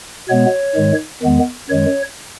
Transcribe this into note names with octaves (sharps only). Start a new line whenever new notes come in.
B2 G#3 B3 C#5
G#2 D#3 G#3
E2 D#3 G#3 B3
F#2 D#3 G#3 C#5